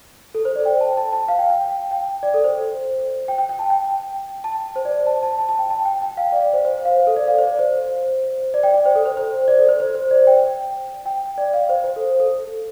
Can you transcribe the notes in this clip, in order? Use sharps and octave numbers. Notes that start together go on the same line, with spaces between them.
A4
C5
D5
G5
A5
A5
A5
F5
G5
G5
G5
D5
A4
C5
G5
G5
G5
A5
G5
A5
C5
D5
A5
A5
A5
A5
G5
A5
G5
G5
F5
D5
D5
C5
C5
F5
C5
A4
D5
F5
C5
D5
C5
D5
G5
D5
C5
A4
C5
C5
D5
A4
C5
C5
C5
D5
G5
G5
D5
F5
C5
C5
A4
A4